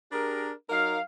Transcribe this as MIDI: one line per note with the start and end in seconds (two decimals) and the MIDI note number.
0.12 0.51 62
0.12 0.51 67
0.12 0.51 68
0.12 0.51 70
0.70 0.99 54
0.70 0.99 63
0.70 0.99 70
0.70 0.99 77